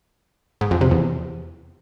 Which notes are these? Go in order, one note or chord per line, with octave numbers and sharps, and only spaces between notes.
G#2
F2
C3
E2